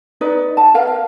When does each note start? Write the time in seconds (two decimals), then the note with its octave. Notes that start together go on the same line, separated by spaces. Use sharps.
0.21 D#4 B4 D5
0.57 A5
0.74 A#4 B4 F5
0.87 F5